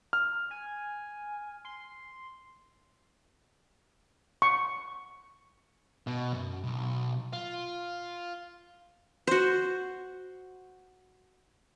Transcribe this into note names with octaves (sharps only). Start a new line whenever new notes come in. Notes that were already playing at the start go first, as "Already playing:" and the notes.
F6
G#5
C6
C#6
B2
F#2
B1
F4
F#4 C5